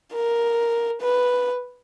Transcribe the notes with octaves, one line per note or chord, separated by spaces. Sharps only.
A#4
B4